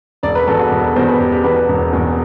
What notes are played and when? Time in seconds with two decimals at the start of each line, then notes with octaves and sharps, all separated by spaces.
0.23 E1 D5
0.35 B4
0.47 E2 B2 A4
0.60 F#4
0.71 E1
0.84 A4
0.96 E2 B2 C5
1.08 B4
1.20 E1 G4
1.32 G4
1.44 E2 B2 B4
1.56 B4
1.68 E1
1.93 E2 B2